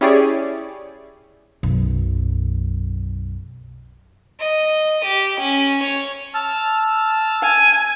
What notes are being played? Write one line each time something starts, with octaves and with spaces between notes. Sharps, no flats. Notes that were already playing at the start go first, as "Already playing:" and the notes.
C#4 E4 G4 G#4 C#5 D5
B1 F#2
D#5
G4
C#4
C#5
A5 E6 F6
G#5